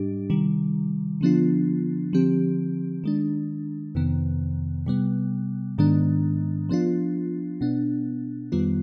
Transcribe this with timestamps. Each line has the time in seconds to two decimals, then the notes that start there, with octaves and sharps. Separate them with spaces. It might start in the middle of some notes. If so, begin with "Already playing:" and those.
Already playing: G#2 G3 D4 G4
0.30 C3 D#3 G3
1.21 D3 F3 B3 D4 F4
2.13 D3 F3 C4 G4
3.04 D#3 G#3 D4
3.95 F2 C3 D#3 B3
4.86 C3 G3 B3
5.78 G#2 D#3 G#3 B3 D4
6.69 F3 B3 D4 F4
7.61 B2 B3 D4
8.52 F2 D#3 G3 B3 F4